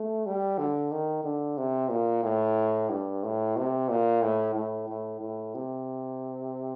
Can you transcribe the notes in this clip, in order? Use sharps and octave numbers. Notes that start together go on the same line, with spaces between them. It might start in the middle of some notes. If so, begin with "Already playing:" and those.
Already playing: A3
G3
D3
D#3
D3
C3
A#2
A2
G2
A2
C3
A#2
A2
A2
A2
A2
C3